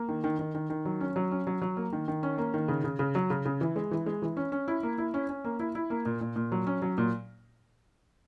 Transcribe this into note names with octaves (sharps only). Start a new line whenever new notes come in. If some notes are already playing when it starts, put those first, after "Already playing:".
Already playing: A#3
D#3
D#3
D#3
D#3
D#3
F#3
C#4
F#3
C#4
F#3
F#3
A#3
D#3
D#3
C#4
A#3
D#3
C#3
C#3
C#3
F#3
C#3
C#3
E3
G#3
E3
G#3
E3
C#4
C#4
E4
A#3
E4
C#4
C#4
A#3
E4
E4
A#3
A#2
A#2
A#2
F#3
C#4
F#3
A#2